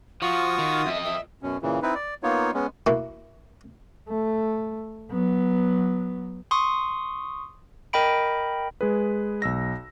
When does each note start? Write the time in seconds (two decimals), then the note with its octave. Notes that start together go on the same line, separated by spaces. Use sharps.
0.22 F3 F4 F#4 C#6 D#6
0.59 D#3
0.86 F2 D#5 E5
1.05 E5
1.42 F#2 B2 C#4
1.62 A#2 C#3 E3
1.82 C4 D#4 E4 B4
1.95 D5
2.23 A#3 B3 D#4 F4 C#5
2.54 G#3 B3 C#4
2.87 A#3 E4 F#4
4.09 A3
5.11 F#3 B3
6.51 C6 C#6 D#6
7.93 A#4 D#5 G5 B5 D7
8.81 G#3 G#4 B4
9.42 B1 E6 A#6